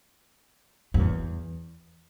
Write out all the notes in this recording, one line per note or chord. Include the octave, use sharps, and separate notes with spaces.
F#2
E2